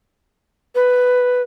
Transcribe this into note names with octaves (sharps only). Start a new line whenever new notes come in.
B4